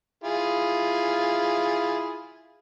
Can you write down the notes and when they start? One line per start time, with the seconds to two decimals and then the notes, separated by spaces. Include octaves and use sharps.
0.24 E4 F4 G#4